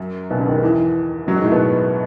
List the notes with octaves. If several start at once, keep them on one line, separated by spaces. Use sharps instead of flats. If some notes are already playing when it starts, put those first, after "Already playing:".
Already playing: F#2 F#3
B1 B2
C#2 C#3
D#2 D#3
G#2
E2 E3
F#2 F#3
G#2 G#3
A2 A3
B2 B3